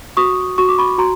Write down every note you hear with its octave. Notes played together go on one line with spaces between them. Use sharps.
F#4 C#6 D#6
F#4 C#6
D6
B5 C#6
F#4 A#5 C6